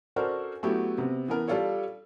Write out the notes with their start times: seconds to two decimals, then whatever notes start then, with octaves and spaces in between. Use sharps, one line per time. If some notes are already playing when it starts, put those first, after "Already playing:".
0.16 C#4 D4 F#4 A4 A#4 C5
0.63 F#3 A3 B3 E4 F#4 G4
0.98 C3 B3
1.28 E3 B3 A#4
1.48 G3 D4 F4 A4 C#5